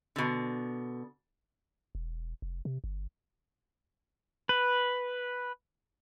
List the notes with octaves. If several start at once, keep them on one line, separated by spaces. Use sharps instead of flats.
B2 D3
E1
F1
C3
G1
B4